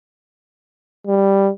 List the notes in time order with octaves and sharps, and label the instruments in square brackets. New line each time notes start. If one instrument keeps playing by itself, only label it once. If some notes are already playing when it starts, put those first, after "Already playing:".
[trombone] G3